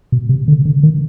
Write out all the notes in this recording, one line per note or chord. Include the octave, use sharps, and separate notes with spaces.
B2
C3
D3
D3
D#3